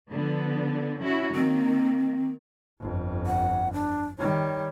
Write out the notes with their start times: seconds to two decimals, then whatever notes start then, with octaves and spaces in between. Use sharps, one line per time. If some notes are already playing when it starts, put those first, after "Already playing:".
0.11 D3 F3 B3
1.01 C#4 E4 F#4
1.35 D#3 A#3 C4
2.80 G1 F2
3.26 F#5
3.73 D4
4.19 D#3 G3 C#5